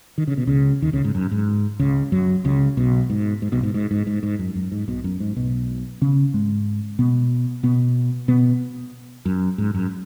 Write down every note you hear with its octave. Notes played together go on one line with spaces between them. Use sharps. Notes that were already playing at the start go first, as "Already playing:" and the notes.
D#3
C#3
B2
C#2 C#3
D#2 D#3
C#2 C#3
G#2
F#2
G#2
C#2 C#3
F#2 F#3
C#2 C#3
B1 B2
G#2
G#2
B1 B2
G#2
G#2
G#2
G#2
G#2
F#2
F#2
G#2
B1 B2
F#2
G#2
B1 B2
C#3 C#4
G#2 G#3
B2 B3
B2 B3
B2 B3
F#2
G#2
F#2